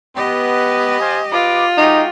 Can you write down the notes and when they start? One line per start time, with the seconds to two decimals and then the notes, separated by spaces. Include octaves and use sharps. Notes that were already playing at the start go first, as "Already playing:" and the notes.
0.16 B3 G4 D#5
1.01 C5 F5 G#5
1.32 F4 B4 D6
1.78 G#3 D#4 F#4 G4